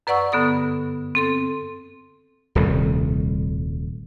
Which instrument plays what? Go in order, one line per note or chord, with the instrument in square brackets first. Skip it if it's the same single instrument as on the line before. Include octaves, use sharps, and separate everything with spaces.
[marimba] F#2 B4 D5 F#5 C#6 E6
G2 D3 B3 A4 D#6
C4 A4 C6
[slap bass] D#1 C2 A2